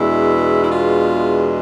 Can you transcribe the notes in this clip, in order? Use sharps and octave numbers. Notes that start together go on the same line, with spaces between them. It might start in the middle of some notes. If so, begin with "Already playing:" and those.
Already playing: E2 B2 G#3 D4 E4
E4
F4